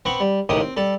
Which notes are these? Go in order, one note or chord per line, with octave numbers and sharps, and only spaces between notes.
B3 C4 F#5 C#6
G3
C#2 A2 D#3 F3 G4 D#6
C4
G3 A4